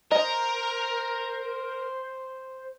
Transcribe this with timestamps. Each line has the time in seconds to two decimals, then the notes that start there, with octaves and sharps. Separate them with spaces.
0.12 A#4 C5 D#5